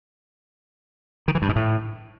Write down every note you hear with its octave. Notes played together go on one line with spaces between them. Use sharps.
D#3
E3
G2
G#2
A2